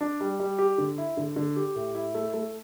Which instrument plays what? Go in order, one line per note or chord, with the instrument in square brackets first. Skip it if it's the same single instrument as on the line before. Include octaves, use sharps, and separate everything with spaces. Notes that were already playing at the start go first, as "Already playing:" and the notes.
[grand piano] D4
G3
G3
G4
D3
E4
D3
D3
G4
A2
E4
A3
A3